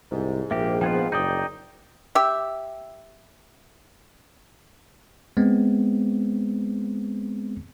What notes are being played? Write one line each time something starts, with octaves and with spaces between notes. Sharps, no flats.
C2 G#2
A#1 A#3 G4 E5
F3 B3 F4 G5 G#6
F#1 D#4 D5 G5 D#6 G6
G4 E5
G#3 B3 C4